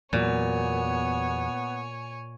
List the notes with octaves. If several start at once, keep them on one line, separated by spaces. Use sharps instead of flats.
E2 A#2 F#3 B3 C#5 G#5